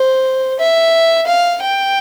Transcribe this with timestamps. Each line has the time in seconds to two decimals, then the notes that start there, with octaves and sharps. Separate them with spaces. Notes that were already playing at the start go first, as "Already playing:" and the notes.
Already playing: C5
0.59 E5
1.27 F5
1.62 G5